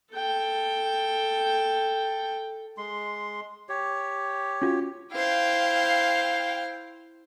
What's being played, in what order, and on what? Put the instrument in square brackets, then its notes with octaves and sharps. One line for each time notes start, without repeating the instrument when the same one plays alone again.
[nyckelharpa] A4 G5
[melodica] G#3 C6
G4 C#5
[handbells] C#4 F4 F#4
[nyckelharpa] E4 C5 [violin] F5 G5